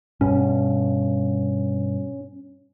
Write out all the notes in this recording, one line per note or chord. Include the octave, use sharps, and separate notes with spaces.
G2 B2 C#4